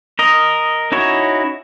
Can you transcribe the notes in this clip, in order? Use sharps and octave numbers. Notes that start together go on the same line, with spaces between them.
A#4 D#5
C#4 D#4 E4 F#4 C#5